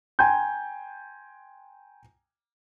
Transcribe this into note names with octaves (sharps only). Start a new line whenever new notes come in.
G5 G#5 A#5 C6 G6